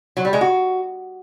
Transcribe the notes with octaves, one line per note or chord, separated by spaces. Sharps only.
F#3
G3
G#3
F#4